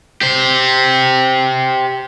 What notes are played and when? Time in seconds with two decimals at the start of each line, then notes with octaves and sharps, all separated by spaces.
0.21 G4 C5